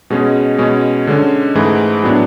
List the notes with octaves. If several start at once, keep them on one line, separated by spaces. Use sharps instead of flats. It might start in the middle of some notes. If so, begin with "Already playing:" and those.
B2 G#3 C#4 G#4
B2 G#3 C#4
D3 G#3 C#4
G#2 E3 A3 E4 G#4
A2 F#3 B3 D4